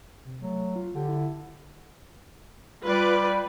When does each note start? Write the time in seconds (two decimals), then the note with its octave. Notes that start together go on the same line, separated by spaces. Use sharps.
0.25 C3
0.42 F#3 A3
0.76 F4
0.95 D3 G4
1.09 E4
2.85 G3 F4 B4 D5